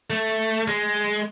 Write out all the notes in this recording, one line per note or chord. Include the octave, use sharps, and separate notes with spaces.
A3
G#3